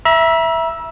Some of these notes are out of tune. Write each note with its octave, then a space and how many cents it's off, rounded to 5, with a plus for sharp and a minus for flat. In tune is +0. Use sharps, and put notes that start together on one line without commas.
E5 +0 A#5 +45 E6 +0